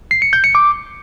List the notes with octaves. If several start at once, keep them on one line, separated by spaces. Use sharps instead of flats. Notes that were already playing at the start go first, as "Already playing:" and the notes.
C7
C#7
G6
C#7
D6